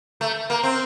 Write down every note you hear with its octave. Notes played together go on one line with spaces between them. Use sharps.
A3
A#3
C4